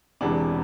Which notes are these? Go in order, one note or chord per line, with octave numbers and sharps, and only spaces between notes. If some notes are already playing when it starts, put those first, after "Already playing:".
E1 E2 C3 E3 D4